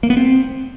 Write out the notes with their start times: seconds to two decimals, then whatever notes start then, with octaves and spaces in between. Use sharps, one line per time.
0.03 A#3
0.10 B3
0.17 C4